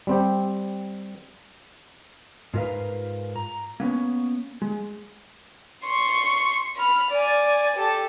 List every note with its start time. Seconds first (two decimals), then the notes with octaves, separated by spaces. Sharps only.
0.07 G3 C4 G4
2.54 G#2 F4 A#4 B4 F5
3.36 A#5
3.80 A#3 B3 C#4
4.62 G#3
5.84 C6 C#6
6.76 B5 F6
7.11 D5 G#5
7.77 G4 A4